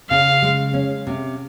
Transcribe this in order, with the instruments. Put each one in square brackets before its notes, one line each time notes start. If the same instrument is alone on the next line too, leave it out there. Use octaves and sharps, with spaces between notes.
[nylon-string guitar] C#3 [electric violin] F5
[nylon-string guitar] G#3
C#4
C3